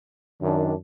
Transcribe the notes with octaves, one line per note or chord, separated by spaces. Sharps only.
F#2 D#3 D4